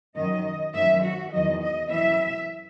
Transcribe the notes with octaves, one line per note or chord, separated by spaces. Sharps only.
F#2 D#3 F#3 D#5
F#2 D#3 F#3 E5
F#4
E2 D#3 F#3 D#5
D#5
F#2 E3 E5